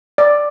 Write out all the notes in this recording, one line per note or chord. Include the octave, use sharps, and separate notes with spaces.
D5